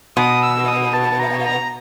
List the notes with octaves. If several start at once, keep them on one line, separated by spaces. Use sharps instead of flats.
B2 D#6
E6
D#6
A5
A#5
A#5